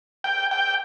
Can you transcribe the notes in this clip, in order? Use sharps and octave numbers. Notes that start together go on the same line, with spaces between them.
G5
G5